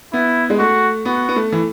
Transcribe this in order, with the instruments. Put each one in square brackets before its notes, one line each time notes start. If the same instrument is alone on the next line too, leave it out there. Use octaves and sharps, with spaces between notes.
[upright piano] B3 [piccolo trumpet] E4
[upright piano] G#3
[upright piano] A3 [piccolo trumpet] F#4
[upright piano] B3 [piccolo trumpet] F#4
[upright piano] B3
A3
E3